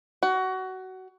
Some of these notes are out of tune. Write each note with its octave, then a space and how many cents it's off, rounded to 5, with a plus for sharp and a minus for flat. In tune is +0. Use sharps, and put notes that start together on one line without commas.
F#4 +20